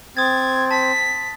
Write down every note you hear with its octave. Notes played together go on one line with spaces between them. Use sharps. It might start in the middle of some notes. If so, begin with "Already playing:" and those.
C4 D#6 G#6 A6
A5 B6